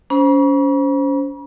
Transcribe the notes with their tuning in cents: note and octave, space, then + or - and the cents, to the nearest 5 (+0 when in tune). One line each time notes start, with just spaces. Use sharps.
C#4 +30 C5 +0 B5 -45